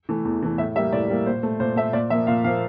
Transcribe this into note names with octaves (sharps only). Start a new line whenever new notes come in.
E3 A3
E2
E3 A3
A2 E5
G3 A#3 E5
A2 D5
G3 A#3
A#2 C5
A3
A#2 C5
A3 E5
A#2 D5
F3 A#3 E5
A#2 F5
F3 A#3 F5